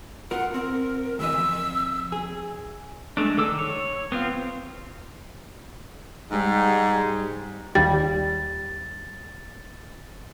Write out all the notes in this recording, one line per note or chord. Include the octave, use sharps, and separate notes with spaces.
F4 A#4 F#5
C4 A#4
D2 E3 D#5 E6
F2
G#4
G#3 A3 D4
D#3 A4 D6 E6
C#5
B3 C4 F4
G#2 G3
D#2 G3 A6